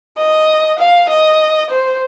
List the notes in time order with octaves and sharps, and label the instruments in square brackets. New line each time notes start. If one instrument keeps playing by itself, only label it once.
[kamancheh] D#5
F5
D#5
C5